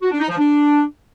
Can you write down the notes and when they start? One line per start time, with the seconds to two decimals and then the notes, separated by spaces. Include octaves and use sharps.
0.02 F#4
0.11 D4
0.20 D#4
0.29 F3
0.38 D4